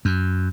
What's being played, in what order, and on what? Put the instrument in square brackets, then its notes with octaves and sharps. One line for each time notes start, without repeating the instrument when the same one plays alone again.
[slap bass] F#2